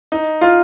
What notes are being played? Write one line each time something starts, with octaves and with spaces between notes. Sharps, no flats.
D#4
F4